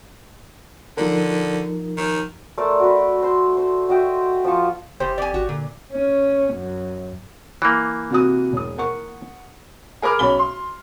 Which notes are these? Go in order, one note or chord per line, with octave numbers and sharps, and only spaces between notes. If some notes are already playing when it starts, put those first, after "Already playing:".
D3 F3 D#4 A#4
D#3
A3 A#4 C5 D5
F#4 B4
C5 C6
C5
F#4 D#5 E5 G5
F3 F4 A5 C#6
F#1 E2 G4 C5
F2 D5 G#5
G#1 F#4
A#2 D3
C#4
F#2
E3 A#3
C3 F#4 D#6
E1 D#6
A#4 F#5 C#6
G#4 A#4 B5 D6 F6
B1 C#4 B5 G7
C6